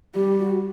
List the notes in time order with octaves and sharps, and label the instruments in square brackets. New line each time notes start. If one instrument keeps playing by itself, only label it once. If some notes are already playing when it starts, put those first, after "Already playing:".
[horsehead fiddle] G3 [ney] G4
[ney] F#4